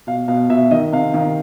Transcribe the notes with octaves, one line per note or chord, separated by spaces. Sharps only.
B2 F5
B2 F5
B2 E5
D#3 D#5
C3 F5
D#3 F5